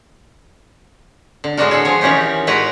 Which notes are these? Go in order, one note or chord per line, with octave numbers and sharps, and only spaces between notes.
D3
A2 G#3 B3 D4 F#4 A#4
G#4 A4
F3 G#4 C#5
D#3 E3 C#4 D#4 G4 C#5
A2 G#3 F#4 B4 C#5 A#5